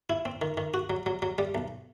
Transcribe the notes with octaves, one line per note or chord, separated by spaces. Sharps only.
E4
C4
D#3
D#3
F#4
F#3
F#3
F#3
G3
B1